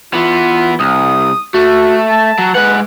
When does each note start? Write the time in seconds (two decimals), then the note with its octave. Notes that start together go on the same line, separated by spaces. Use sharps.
0.14 E3 B3 F4
0.80 C2 D#6
1.54 A3 F#4
2.09 A5
2.38 F#3
2.55 G#3 B4 F#5